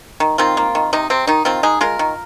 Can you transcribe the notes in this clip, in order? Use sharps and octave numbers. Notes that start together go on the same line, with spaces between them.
D#3
D#3 C4 F4
A#3
D#3
C3 D#4
C3 C4
D#3 D#4
D#3 C4 F4
G#3 D#4 G#4
G#3 F4 A#4
D#3